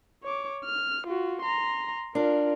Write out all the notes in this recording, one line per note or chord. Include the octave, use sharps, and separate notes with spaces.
C#5 D6
F6
F4 F#4
A#5 C6
D4 F4 A#4